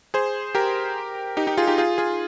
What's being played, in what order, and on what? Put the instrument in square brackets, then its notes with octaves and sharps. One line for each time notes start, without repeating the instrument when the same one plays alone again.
[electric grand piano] G#4 C5
G4 A#4
D#4 G4
D#4 G4
F4 G#4
D#4 G4
F4 G#4
F4 G#4